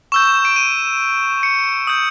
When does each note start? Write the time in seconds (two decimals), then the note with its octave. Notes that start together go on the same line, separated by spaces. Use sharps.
0.12 C#6 E6 G6 E7
0.45 D7
0.56 D#7
1.43 C#7
1.87 D#6 G6